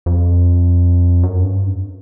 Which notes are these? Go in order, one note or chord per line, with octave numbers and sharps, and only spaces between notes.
F2
F#2
G2